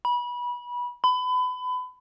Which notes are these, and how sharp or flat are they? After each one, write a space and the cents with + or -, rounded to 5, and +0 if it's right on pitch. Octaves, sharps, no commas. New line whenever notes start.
B5 -25
B5 +30